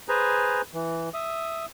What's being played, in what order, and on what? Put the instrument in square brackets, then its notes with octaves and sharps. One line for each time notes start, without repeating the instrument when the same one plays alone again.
[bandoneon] G#4 B4 C5 G#5 A#5
E3
E5 D#6